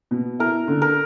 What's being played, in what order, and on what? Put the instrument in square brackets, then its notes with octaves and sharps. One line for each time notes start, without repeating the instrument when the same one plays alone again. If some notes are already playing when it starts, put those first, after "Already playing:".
[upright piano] B2
[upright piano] E4 [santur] A#4
[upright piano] D3
[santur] A#4